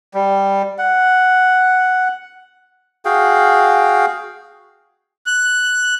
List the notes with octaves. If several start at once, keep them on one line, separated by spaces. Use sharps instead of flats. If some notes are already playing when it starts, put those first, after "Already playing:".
G3
F#5
F#4 G#4 F5 G5
F#6